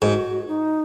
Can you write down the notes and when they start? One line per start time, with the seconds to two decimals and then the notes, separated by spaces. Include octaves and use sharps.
0.02 G#2 F#4
0.48 D#4